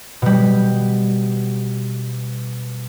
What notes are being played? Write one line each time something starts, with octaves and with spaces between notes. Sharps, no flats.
B2 G3